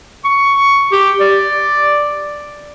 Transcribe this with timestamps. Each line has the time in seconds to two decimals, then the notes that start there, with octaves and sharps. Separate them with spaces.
0.25 C#6
0.92 G4
1.20 D5